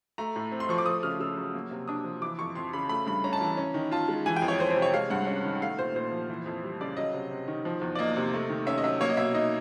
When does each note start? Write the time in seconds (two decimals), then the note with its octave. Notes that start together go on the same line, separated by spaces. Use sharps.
0.18 A3 A#5
0.36 A2
0.52 C4
0.60 C6
0.69 F3 C#6
0.78 D6
0.86 A3 D#6
1.03 C#3 F6
1.20 C#3 E6
1.38 F#3
1.54 A#3
1.71 C3
1.88 D4 D#6
2.05 F3
2.22 E3 D6
2.39 F2 C#6
2.55 F2 C6
2.73 C#3 B5
2.89 A3 B5
3.07 G2 B5
3.24 C#4 A#5
3.33 A5
3.41 E3 A#5
3.57 C#4
3.74 D#3
3.91 F4 A5
4.08 G#3
4.26 E3 G#5
4.36 G5
4.42 F2
4.48 C#5
4.59 F2 C5
4.70 C5
4.76 C3
4.82 C#5
4.94 G#3 F5
5.10 G2 F#5
5.27 C#4
5.45 D#3
5.61 A3 F5
5.78 A#2 C5
5.95 A#2 C5
6.12 F3
6.30 E3
6.46 F2
6.63 G3
6.81 C#3 D5
6.97 F#3 D#5
7.14 C3
7.31 C3
7.48 D#3
7.65 F3
7.81 E2
7.95 D5
7.99 A#3 D#5
8.16 C3
8.34 A3
8.50 D#3
8.67 C#4 E5
8.78 D#5
8.84 F#3 E5
9.01 A#3 C#5
9.10 D#5
9.17 B2 E5
9.34 D#4 D#5